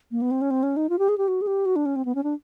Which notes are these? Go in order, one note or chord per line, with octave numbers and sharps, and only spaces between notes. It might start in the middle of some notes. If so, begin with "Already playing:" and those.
A#3
B3
C4
C#4
C4
C#4
D#4
F4
G4
G#4
G4
F#4
G#4
G4
F#4
D4
C#4
C4
B3
C#4
D4